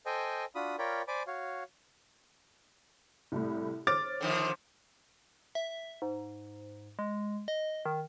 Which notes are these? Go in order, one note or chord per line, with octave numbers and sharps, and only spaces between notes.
A4 C5 D#5 G5 G#5
D4 F4 F#4 B5 D#6
F4 A#4 C#5 D5 G5 B5
C5 D5 G#5 B5 D6
F#4 C#5 F5
C2 A2
C5 C#5 D6 F6 A6
D3 D#3 F3
E5
G#2
G#3
D#5
D#3